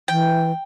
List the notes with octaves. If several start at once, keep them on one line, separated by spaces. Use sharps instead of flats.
E3 G5